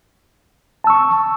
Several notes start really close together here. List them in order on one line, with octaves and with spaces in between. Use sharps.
A5 E6 C#6